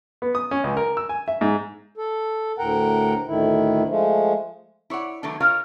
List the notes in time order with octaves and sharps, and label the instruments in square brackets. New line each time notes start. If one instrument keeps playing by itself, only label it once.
[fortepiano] B3
D#6
C#4
C#2
A#4
E6
G#5
E5
G#2
[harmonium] A4
D2 A2 A#4 F#5 G5
D2 A2 D#3 E4
F3 G#3 A3
[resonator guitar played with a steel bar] E4 C#5 D5 F#5
D#3 F#3 A3 B3 D4
F4 A#4 C#5 D#5 F5